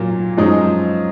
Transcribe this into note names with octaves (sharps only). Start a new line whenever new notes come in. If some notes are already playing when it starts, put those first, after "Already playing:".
Already playing: A#2 F#3 A#3
F#2 F3 G#3 D#4